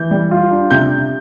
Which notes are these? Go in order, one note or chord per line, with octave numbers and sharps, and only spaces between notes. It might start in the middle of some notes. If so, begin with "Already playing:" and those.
Already playing: E3 G6
G3
F4
D4
C3 G6